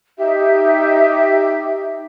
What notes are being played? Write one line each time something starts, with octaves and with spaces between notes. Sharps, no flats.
D#4 G4 E5